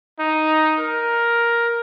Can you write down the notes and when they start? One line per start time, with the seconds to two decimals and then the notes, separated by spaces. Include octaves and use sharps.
0.19 D#4
0.80 A#4